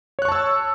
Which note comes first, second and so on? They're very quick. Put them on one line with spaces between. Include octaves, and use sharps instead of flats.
C#5 F#6 C#6 A5 E6